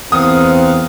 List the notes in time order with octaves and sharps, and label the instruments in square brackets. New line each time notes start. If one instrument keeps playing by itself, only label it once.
[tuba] E2 [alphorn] C4 [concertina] A#4 F5 F#5 [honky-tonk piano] D#6